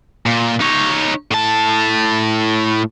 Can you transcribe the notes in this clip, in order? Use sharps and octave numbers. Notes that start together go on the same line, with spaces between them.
A#2
D#4 C#5
A2 A5